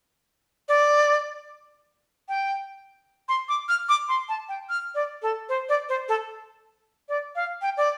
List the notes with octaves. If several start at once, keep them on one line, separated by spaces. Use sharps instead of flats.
D5
G5
C6
D6
F6
D6
C6
A5
G5
F6
D5
A4
C5
D5
C5
A4
D5
F5
G5
D5